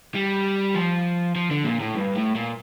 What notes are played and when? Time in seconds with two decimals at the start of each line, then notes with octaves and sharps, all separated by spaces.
0.16 G3
0.75 F3
1.36 F3
1.51 D3
1.65 A#2
1.80 A2
1.95 G2
2.15 A2
2.35 A#2